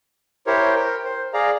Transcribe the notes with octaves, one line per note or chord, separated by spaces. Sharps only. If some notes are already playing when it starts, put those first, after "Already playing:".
E4 G4 A#4 C5 C#5
A#4 G5
C5
G#4 D5 F5 A#5